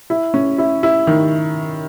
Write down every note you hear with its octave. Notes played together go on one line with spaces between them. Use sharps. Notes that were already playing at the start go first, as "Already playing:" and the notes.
E4
C#4
E4
E4
D#3